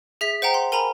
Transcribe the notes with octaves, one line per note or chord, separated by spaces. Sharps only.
G#4 E5 B6
C5 F#5 G5 A#5
C6
A#4 G#5 A#5 B5